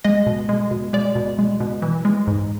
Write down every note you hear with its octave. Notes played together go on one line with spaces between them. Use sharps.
G#3 D#5
B2
G#3
B2
G#3 D5
B2
G#3
B2
E3
G#3
G#2